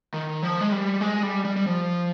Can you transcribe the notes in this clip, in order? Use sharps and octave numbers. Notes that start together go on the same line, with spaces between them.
D#3
F3
G#3
G3
G#3
G3
G3
G3
F3